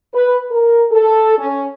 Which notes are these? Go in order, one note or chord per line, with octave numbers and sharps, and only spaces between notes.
B4
A#4
A4
C#4